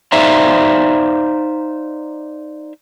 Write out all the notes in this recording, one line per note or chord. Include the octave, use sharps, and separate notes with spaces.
D#4 C5 D5 E5 F5 A#5